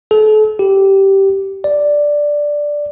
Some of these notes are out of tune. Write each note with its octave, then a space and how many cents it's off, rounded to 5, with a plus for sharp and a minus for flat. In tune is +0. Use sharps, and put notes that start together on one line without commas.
A4 -40
G4 -10
D5 +0